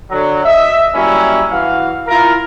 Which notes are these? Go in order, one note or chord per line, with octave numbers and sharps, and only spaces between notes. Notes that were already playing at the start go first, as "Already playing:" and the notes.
D3 F#3
D#5 E5
F#3 G3 A#3 C#4 E4
E3 F#4 F5
E4 F4 A#4